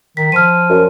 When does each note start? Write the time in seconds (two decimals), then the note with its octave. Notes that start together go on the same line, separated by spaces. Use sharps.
0.17 D#3 B6
0.32 F3 F6 D#7
0.69 F#2